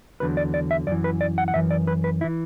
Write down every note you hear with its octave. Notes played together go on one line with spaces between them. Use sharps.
E2 D3 F#3 B4
D5
D5
E5
F#2 E3 D5
B4
D5
F#5
F#5
F#2 E3 E5
D5
B4
B4
E4
E3